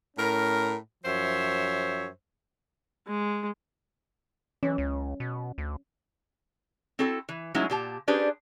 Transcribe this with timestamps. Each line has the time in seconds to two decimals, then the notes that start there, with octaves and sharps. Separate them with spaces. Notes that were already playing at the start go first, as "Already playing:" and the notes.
0.17 A2 C#4 A#4
1.04 F#2 F3 C5 C#5 E5
3.07 G#3
4.63 E3 C#4
4.78 C#2
5.20 B2
5.58 D2
6.99 C4 E4 F#4 A4
7.29 E3
7.55 F#3 G#3 A3 C#4 D#4 E4
7.70 A#2 G4 A5
8.08 C#4 D4 G4 G#4 B4 C5